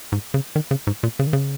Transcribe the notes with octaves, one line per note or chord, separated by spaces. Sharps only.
G#2
C#3
D#3
C#3
G#2
A#2
C#3
D#3
C#3